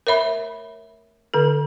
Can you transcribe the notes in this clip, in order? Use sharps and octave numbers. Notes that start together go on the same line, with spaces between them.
A#4 C#5 E5 B5
D3 A4